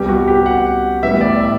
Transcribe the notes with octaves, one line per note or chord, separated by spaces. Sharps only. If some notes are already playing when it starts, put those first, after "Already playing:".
Already playing: C2 C3 G3 B3 G4
F#4
G4
F#5
A2 E3 G3 B3 E5
D5
E5